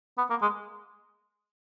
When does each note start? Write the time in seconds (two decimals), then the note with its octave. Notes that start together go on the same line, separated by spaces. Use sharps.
0.18 B3
0.30 A#3
0.42 G#3